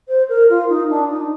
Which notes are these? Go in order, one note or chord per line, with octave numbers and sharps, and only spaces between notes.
C5
A#4
F4
D#4
D4
D#4